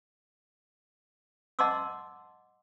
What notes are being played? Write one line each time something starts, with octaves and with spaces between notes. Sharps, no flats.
D#5 F#5 A5 C6 D6 E6